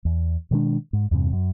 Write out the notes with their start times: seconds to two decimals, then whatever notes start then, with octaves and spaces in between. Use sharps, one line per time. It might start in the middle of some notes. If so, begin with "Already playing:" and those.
0.05 E2
0.51 B2 D#3 G#3 D4
0.93 G#2
1.11 E2 G2 C3
1.33 F#2